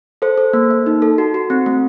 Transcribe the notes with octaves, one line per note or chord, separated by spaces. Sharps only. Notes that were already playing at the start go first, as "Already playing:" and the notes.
A4 C5
A4
A#3
A#3
D#4
A4
F#4
F#4
C4
A3